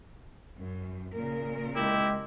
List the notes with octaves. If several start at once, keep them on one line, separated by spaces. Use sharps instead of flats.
F#2
A#2 C#3 A#4
G#3 E4 G4